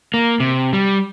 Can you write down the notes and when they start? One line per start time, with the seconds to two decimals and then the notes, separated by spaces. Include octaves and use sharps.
0.14 A#3
0.40 C3
0.73 G3